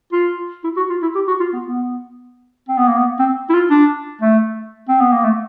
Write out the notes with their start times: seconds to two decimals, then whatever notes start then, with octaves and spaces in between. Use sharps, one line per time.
0.13 F4
0.64 E4
0.77 F#4
0.90 F4
1.02 E4
1.15 G4
1.27 F#4
1.40 F4
1.53 B3
1.66 B3
2.68 C4
2.78 B3
2.88 A#3
2.98 B3
3.19 C4
3.49 E4
3.54 F4
3.70 D4
4.22 A3
4.89 C4
5.00 B3
5.13 A#3
5.24 A3